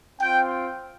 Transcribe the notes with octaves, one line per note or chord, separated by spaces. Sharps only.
C4 F4 G5